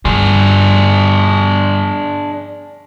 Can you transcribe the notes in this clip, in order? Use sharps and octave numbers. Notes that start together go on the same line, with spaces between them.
G2 D3 D4 G#4